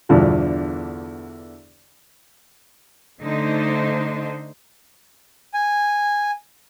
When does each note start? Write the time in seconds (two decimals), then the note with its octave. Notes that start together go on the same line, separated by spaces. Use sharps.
0.09 E2 G2 B2 D3 E3 F3
3.20 D3 A3 D#4 C5
5.54 G#5